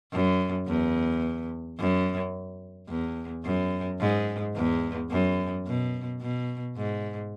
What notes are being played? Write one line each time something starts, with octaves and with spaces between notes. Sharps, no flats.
F#2
E2
F#2
E2
F#2
G#2
E2
F#2
B2
B2
G#2